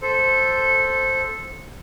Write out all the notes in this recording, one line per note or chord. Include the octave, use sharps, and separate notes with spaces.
A4 C5